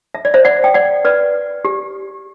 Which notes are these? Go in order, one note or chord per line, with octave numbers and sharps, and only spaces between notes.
E5
D5
C5 E5
D5 F#5
G5
D5 F#5
B4 D5
G4